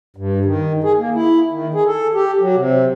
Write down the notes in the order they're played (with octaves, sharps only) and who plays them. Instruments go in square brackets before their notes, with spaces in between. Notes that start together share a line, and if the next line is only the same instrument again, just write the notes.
[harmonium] G2
D#3
G#4
A#3
E4
D#3
G#4
A4
G4
F#3
C3